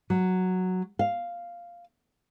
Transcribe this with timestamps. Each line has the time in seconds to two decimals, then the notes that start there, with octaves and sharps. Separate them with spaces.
0.10 F#3
0.99 F5